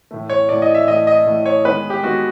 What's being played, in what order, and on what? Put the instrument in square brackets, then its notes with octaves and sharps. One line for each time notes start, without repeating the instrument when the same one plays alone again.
[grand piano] A2 E3 A3
C#5
A2 E3 A3 D5
D#5
E5
A2 E3 A3 D#5
D#5
A2 E3 A3
C#5
D#3 G#3 B3 B4
G4
D#3 G#3 B3 F#4